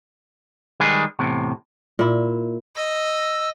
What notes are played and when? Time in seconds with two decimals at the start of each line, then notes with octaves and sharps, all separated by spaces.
0.80 D#3 G3 G#3 G#4 B4
1.19 E2 A2 C3
1.99 A#2 E4
2.76 D#5 E6 A#6